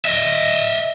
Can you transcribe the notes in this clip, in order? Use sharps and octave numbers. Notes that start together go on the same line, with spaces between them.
D#5 E5